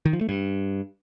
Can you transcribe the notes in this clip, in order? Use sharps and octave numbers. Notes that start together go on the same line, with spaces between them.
D#3
F3
A3
G2